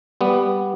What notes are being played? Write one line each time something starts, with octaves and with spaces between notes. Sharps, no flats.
G3 B3